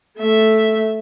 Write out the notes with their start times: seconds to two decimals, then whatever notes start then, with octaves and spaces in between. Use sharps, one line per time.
0.17 A3 E5